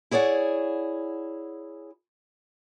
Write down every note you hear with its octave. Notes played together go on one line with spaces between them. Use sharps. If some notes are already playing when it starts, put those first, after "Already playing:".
E4 G#4 C#5 D5 F#5